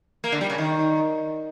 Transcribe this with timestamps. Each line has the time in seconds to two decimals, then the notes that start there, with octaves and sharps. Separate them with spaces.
0.24 A#3
0.32 D3
0.41 G3
0.50 C#3
0.58 D#3